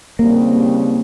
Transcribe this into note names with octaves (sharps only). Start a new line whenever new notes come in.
D#2 C#3 G3 A#3 C4